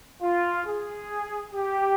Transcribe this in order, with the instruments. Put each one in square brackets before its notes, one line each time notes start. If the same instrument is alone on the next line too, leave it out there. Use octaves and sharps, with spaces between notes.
[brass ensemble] F4
G#4
G4